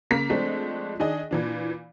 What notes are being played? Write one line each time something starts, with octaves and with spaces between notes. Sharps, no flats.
C#3 A#3 A#5 B6
F3 G#3 A3 C4 D4
D#3 D4 G#4 D#5
A#2 E3 D4